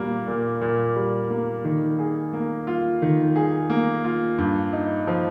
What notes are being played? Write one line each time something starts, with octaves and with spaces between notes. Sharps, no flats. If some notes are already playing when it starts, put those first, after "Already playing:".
Already playing: A#2 G3 A#3
A#2
A#2
G3
A#3
D#3
G#4
A#3
F4
D#3
G#4
A#3
F4
G2
D#4
F3